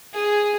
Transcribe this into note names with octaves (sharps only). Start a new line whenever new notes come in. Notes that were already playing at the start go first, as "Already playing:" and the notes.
G#4